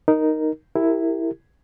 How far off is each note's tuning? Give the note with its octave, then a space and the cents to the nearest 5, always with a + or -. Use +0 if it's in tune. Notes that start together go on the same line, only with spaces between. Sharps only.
D#4 +0 A#4 +0
E4 +0 G4 +0 A#4 -25